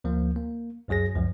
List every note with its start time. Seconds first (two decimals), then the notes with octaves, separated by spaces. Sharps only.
0.04 D2 F3 A#3
0.36 A#3
0.88 C#2 F#2 F#3 G#4 A#6
1.15 C#2 F#2 F3